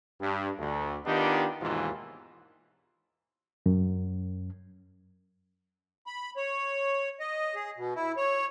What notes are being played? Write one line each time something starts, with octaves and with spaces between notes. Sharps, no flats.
G2
D2
D#3 B3 D4 D#4 F4 G4
D#2 G#2 B2 E3 F4
F#2
B5
C#5
D#5
G#4
B2
E4
C#5